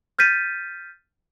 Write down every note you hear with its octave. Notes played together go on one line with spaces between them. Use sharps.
F6 G6 A6 B6 D#7